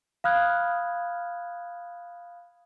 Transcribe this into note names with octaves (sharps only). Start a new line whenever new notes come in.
F5 B5 D#6 F6 F#6 G#6